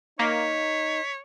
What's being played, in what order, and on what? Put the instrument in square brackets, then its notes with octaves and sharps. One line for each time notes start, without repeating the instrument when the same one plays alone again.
[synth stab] A#3 [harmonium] D#4 [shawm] C#5 [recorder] B6